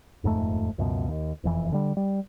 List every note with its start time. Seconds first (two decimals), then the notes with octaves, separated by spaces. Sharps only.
0.24 D#1 F2 G#2 A3
0.78 C#2 F#2 B2
1.08 D#2
1.44 E1 F2 E3
1.72 D3 G3
1.97 G3